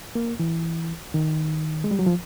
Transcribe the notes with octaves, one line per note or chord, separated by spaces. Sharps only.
A#3
E3
D#3
G#3
G3
F#3
F3